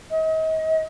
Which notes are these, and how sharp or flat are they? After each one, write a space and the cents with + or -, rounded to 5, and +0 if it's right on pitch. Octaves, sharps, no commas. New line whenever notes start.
D#5 +35